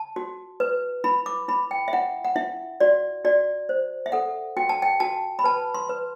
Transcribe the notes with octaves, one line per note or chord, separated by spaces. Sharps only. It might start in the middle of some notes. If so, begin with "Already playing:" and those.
Already playing: A5
F#4
B4
E4 B5
D6
E4 B5
G5
E5
E4 F#5
F#5
E4 E5
F#4 D5
F#4 D5
C5
E5
A4 F#5
F#4 G5
A5
G5
F#4 A5
B5
B4 A5
C6
B4